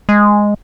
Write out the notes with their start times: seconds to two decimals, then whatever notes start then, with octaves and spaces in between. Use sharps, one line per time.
0.09 G#3